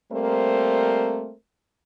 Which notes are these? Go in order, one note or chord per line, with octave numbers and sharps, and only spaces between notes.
G3 A3 A#3 C4 A#4 C5